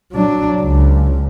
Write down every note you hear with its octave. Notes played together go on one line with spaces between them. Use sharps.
F#3 D4
C#2